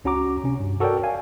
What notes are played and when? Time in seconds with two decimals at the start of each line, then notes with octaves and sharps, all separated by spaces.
0.04 C#2 C#4 F#4 A#5 D6
0.44 C3 C#4
0.60 G2
0.80 F#4 A4 A#4 C#5 D5 G5
1.03 F5 G#5